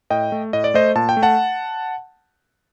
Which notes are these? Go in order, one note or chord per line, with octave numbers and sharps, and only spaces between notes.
A2 D#5 G5
A3
A2 D#5
D5
A3 C5 D#5
A#2 A5
G5
A3
F#5 A5